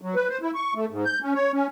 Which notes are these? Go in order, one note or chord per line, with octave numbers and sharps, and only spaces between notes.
F#3
B4
C5
E4
C#6
A3
G#2
G6
C#4
C#5
C#4